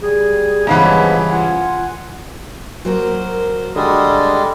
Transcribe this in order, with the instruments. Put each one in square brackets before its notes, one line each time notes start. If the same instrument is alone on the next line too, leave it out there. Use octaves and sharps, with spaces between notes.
[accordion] G3 [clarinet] G#4
[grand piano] G2 C#3 E3 [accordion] F3 G#3 B3 [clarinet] B5
[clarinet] F4 [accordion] F#5 G#5
[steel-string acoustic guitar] F#3 A#3 F#4 [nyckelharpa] A#4 C5
[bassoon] D3 [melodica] G3 G#3 [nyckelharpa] D#6